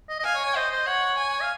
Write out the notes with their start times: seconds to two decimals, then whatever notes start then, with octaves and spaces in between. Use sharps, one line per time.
0.09 D#5
0.19 D#5
0.24 F5 G#5
0.35 C#5
0.45 C#5
0.56 C5 D#5
0.71 C5
0.87 C#5 F#5
1.19 G#5
1.42 F5